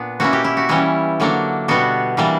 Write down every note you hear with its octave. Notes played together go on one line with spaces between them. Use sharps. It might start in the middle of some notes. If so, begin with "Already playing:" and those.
Already playing: A#2 B3 D4
B2 A#3 C#4 E4 F#4
G4
E4
F#4
E3 G3 C#4 E4
D3 F#3 A#3 D4
B2 G3 B3 D4 F#4
E3 G3 A#3 D4